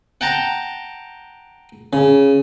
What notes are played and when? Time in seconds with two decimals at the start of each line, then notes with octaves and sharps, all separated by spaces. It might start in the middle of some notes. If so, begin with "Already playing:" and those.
0.21 F#5 G5 A5 A#5
1.93 C#3